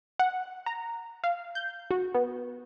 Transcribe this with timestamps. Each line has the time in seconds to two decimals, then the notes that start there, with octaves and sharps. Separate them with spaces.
0.19 F#5
0.66 A#5
1.24 F5
1.55 G6
1.91 F#4
2.15 B3